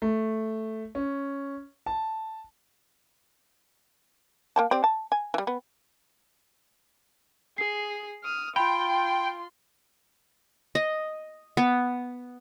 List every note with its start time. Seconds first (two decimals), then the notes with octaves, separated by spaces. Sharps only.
0.02 A3
0.95 C#4
1.86 A5
4.56 A#3 G5 A5
4.71 C4 G4 D5
4.84 A5
5.12 G#5
5.34 E3 G3
5.47 B3
7.58 G#4 C7
8.24 D#6 F6
8.56 F4 G5 B5 C6
10.75 D#5
11.57 B3